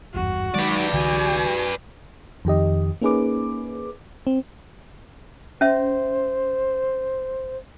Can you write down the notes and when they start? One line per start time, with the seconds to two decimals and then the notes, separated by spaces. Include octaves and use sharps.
0.14 G#1 E2 G2 F#4
0.54 D#3 F#3 G#3 D#4 B4 D5
0.92 C2 D3 E3 F#4 G#5
2.45 F2 D#3 G4 D#5
3.01 A#3 C#4 D#4 G#4 B4 D6
4.27 C4
5.61 C#4 C5 E5